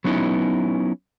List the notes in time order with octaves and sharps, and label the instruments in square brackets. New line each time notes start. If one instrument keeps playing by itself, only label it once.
[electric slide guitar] F#3 B3 C#4 D#4 E4